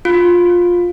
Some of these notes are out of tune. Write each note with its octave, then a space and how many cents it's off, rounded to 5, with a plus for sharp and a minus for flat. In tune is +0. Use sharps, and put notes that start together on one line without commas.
F4 +15